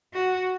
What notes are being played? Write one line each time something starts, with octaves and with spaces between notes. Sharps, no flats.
F#4